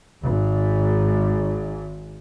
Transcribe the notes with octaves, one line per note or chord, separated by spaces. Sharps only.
G#1 G#2